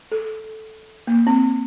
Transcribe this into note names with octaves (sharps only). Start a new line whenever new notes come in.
A4
A#3
C4